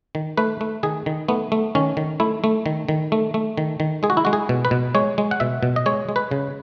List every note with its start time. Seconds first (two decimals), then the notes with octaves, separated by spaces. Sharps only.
0.15 D#3
0.37 A3 B4
0.61 A3
0.83 D#3 G#4
1.06 D#3
1.28 A3 B3
1.52 A3
1.75 D#3 C#4
1.97 D#3
2.20 A3 E4
2.44 A3
2.66 D#3
2.89 D#3
3.12 A3
3.34 A3
3.57 D#3
3.80 D#3
4.03 G#3 G#4
4.10 F#4
4.17 E4
4.25 G#3 F#4
4.33 G#4
4.49 B2
4.65 B4
4.71 B2
4.95 G#3 C#5
5.18 G#3
5.31 F#5
5.40 B2 E5
5.63 B2
5.76 D#5
5.86 G#3 C#5
6.09 G#3
6.16 B4
6.31 C#3